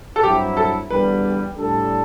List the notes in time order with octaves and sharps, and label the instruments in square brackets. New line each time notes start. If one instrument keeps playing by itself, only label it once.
[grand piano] A4
[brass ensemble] G2 F#3 C4 E4 [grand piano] G4
[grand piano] A4
[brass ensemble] E2 D3 G3 D4 [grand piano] B4
[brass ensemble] A2 G3 D4 A4